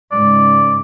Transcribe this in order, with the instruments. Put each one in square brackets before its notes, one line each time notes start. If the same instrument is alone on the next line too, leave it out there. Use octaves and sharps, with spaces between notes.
[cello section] G#2 C#3 [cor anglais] D5